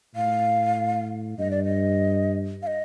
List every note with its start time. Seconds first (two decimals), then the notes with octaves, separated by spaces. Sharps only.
0.16 A2 F5
1.39 G2 D#5
1.51 D5
1.65 D#5
2.62 F5
2.67 D#5